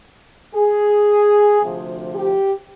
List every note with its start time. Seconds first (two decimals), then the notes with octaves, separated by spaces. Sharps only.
0.55 G#4
1.61 D2 C3 F3
2.15 G4